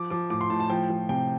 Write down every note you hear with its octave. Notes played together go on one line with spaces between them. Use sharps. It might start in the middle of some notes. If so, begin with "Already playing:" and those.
Already playing: F3 D6
F3 D6
A2 D6
C6
A2 A5
A5
F3 G5
F3
C3 G5